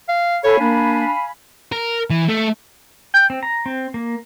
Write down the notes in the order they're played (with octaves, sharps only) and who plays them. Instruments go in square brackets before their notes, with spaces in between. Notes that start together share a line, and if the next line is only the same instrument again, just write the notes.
[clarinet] F5
[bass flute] A4 [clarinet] C#5 [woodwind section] F5 G#5 B5
[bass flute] A#3 [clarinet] D4
[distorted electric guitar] A#4
E3
A3
[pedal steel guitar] G5
C4
A#5
C4
A#3